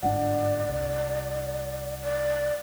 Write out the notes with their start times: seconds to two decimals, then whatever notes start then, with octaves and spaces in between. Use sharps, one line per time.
0.03 G1 G#2 D4 D5 F#5
0.69 C2
2.02 D5